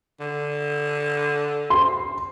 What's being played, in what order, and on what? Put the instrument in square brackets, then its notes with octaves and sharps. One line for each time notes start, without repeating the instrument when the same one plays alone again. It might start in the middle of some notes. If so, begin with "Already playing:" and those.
[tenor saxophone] D3
[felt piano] C6